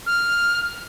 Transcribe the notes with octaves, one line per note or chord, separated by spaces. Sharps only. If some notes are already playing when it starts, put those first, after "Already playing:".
F6